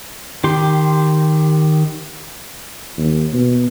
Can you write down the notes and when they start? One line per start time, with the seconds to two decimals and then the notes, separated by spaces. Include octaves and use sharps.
0.44 D#3 G4 C6
2.97 D#2
3.33 B2